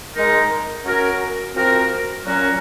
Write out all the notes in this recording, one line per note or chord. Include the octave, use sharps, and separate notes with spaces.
G#3 D#4 A#4
F#3 C#4 F#4 A#4
F3 C4 F#4 A#4
A#2 F#3 C#4 F#4 A#4